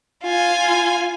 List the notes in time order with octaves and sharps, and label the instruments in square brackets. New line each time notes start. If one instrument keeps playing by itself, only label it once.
[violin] F4 G#5